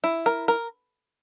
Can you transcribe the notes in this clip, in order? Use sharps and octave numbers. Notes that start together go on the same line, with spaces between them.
E4
A#4
A#4